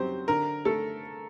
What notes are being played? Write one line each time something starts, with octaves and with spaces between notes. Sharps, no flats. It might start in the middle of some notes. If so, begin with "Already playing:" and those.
Already playing: F#2 F#3 C4 G4 C5
D3 A#4
A3 A4